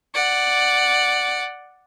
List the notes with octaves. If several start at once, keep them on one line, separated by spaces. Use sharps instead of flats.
D5 F#5